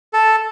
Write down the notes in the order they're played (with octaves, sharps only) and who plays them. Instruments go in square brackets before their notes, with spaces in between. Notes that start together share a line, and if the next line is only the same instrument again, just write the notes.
[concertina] A4